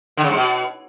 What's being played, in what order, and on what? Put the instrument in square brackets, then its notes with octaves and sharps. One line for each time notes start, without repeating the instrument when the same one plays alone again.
[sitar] D3
C#3
G#2
B2